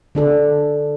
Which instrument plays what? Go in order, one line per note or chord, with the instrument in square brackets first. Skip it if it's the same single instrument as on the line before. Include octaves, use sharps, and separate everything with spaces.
[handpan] D3 D4 A4